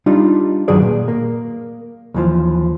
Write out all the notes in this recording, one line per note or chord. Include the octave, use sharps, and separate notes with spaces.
G3 D4 D#4 F4
G2 D#3 F#3 G#4 B4 D5
A#2
A#3
D#2 E3 F3